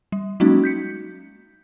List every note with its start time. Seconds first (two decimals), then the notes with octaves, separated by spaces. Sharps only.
0.12 G3
0.40 F#3 G#3 A#3 C#4 D#4 F#4
0.64 G6 B6 C#7